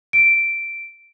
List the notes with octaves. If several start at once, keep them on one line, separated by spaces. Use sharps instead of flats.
D7